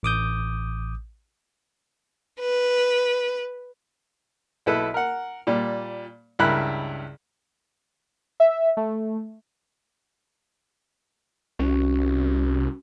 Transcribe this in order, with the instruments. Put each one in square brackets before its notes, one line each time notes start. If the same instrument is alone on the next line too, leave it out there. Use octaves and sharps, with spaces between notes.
[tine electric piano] A1 D6 D#6 G6
[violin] B4
[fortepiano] B1 E4 A4 B4
A#4 F#5
A#2 G3
C#2 G2 E4 A#4 B5 F#6
[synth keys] E5
A3
[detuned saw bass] C2 [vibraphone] C#4 F#4